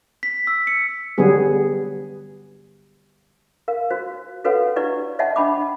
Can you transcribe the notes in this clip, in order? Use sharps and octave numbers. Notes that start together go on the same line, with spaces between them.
B6
E6
C#7
D3 F#3 G3 B3 G#4
A#4 F5
F#4 C5
F#4 A4 B4 C#5 F5 F#5
D4 E4 G4 B4 D5
C#5 D#5 E5 F#5 G5 A5
D4 G5 A5 B5 D6